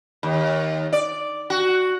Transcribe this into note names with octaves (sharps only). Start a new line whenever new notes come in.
D#2
D5
F#4